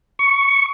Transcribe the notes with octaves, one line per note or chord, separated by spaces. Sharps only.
C#6